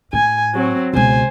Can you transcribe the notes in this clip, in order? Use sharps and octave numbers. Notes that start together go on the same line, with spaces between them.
A2 G#5
F#3 C4
C#2 B2 C5 G#5